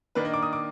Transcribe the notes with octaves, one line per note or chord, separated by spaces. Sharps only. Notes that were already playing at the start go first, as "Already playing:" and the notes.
D#3 A#3 D4 B4
D#5
D6
D#6
D6